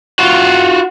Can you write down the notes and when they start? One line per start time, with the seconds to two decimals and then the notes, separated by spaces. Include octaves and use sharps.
0.19 F4 F#4